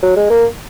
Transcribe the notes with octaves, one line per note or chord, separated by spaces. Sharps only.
F#3
G#3
A#3